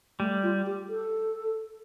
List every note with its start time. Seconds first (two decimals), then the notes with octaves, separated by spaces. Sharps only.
0.19 G3 A3
0.43 F4
0.66 G4
0.89 A4